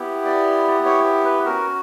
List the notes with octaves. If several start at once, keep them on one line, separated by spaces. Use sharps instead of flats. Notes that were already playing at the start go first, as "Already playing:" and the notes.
Already playing: B3 E4 G4
D5
C#5
B4
C#4 F#4 A#4